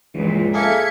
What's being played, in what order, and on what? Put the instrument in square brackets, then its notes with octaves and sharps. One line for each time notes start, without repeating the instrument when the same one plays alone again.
[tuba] C#2 [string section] G2 A#2 [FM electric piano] E3 F3
[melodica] A#3 F5 [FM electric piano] G#4 A4 E5 [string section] G#6 B6 C#7